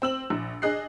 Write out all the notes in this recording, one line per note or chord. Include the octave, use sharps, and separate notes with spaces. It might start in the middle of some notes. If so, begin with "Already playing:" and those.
C4 E6 F#7
A#1
D4 G#4 D#5 F#6 C7